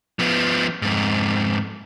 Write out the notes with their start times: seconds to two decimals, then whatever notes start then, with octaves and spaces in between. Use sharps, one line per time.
0.19 F3 B3
0.82 F2 G#2